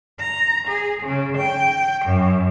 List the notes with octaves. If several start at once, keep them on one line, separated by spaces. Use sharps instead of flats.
A#5
G#4
C#3
G5
F#2